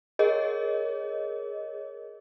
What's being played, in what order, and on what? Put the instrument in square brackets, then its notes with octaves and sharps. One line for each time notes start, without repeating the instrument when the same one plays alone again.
[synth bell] G#4 A#4 C#5 D#5